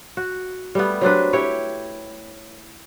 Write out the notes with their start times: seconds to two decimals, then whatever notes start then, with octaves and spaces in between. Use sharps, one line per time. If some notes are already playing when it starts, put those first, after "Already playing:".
0.17 F#4
0.75 G3 A3 B3
1.01 F#3 C4 D4 B4
1.33 E4 G4 C#5